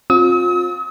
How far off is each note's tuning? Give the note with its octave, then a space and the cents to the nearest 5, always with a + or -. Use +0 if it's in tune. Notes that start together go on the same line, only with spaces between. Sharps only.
C4 +25 F4 +30 D#6 +45